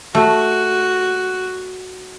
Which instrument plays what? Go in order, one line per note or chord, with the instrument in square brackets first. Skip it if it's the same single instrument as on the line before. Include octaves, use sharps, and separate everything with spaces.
[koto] A3 [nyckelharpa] F#4